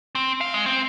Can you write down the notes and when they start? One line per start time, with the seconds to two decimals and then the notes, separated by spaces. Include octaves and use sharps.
0.15 C4
0.41 F5
0.54 G#3
0.66 C4